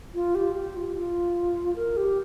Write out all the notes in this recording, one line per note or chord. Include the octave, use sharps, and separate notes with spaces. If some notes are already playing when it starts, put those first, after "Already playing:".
F4
G4
G4
F4
F4
A#4
G4